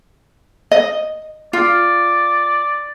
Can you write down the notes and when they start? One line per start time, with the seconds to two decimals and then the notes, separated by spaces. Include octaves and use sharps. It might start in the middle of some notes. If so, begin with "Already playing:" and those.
0.71 D#5
1.53 F4 D5